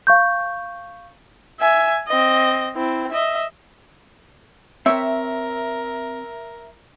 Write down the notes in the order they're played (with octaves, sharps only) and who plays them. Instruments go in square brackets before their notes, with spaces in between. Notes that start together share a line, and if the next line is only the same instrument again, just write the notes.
[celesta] F5 C#6 G6
[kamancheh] E5 G#5
C4 D#5
C4 E4
D#5 E5
[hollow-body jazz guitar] C4 C#5 G5 [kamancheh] A#4 [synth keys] E5